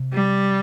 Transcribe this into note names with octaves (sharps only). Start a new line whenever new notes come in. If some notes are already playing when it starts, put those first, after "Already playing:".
Already playing: C3
G3